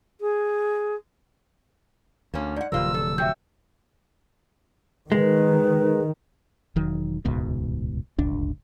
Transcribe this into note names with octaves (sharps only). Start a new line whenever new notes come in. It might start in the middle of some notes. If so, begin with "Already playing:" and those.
G#4
D2 A#3 C#4
G#2 D5 F#5
D1 C3 F3 G3 F4 A#4 E6
A4
F#3 E5 G5 G6
D#3 G#3 B4
E1 D#3 F#3
D#1 C#2 G#2 B2
D1 G1 C#2 D4